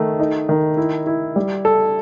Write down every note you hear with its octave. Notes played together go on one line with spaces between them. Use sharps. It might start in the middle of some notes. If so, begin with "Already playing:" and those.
Already playing: D#3 A3
D#4
D#3
E4
E4
G3
A4